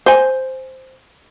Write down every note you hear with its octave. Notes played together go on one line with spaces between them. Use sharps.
C5 G#5